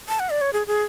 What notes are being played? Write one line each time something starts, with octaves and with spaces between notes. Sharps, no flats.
A5
F#5
D5
C#5
G#4
G#4